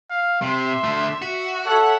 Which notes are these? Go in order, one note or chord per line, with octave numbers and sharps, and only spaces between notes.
F5
C3 E5 C6
D3 A3
F#4
A4 C#5 E5 F#5 F#6